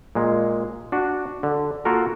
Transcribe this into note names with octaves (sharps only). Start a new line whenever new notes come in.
A#2 G#3
D4 F#4
D3
A#3 F4 F#4 A4 A#4